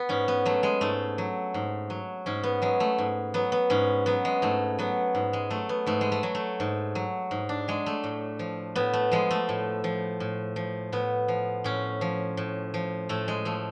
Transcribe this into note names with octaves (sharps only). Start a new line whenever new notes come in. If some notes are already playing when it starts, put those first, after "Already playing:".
Already playing: B3
G#2 C#4
B3
F#3 A3
G#3
G#2 A3
F#3
G#2
F#3
G#2 C#4
B3
F#3 G#3
A3
G#2
F#3 B3
B3
G#2 C#4
F#3 B3
G#3
G#2 A3
F#3 B3
G#2
G#3
F#3 A3
B3
G#2 A3
G#3
A3
F#3
A3
G#2
F#3
G#2
D4
F#3 G#3
A3
A2
F3
A2 B3
A3
F3 G#3
A3
A2
F3
A2
F3
A2 B3
F3
A2 C#4
F3
A2
F3
A2 A3
G#3
F3 A3